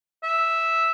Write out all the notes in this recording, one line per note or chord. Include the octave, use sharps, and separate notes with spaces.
E5